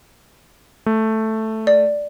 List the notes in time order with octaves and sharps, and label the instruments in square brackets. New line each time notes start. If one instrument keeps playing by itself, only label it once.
[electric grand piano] A3
[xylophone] D5